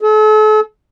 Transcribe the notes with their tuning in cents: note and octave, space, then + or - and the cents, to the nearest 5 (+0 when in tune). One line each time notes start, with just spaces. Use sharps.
A4 -40